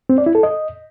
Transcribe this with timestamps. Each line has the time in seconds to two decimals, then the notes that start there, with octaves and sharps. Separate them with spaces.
0.09 C4
0.18 D5
0.26 E4
0.35 A4
0.43 D#5